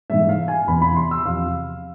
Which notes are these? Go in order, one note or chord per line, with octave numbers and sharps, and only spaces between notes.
G#2 E3 G#3 E5
F5
G#5
E2 C3 E3 B3 B5
B5
C6
E6
E2 C3 F3 F5